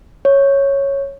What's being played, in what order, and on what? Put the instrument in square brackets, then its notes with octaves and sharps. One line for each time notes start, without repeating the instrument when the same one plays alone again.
[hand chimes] C#5